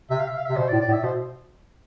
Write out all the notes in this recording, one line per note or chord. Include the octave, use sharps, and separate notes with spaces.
C3 E5
F5
E5
F5
C3 E5
B2 C5
D5
A2
D5
A2
E5
B2 C5